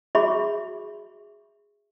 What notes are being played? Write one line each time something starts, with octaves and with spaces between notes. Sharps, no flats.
F#4 G#4 E5 B5 C#6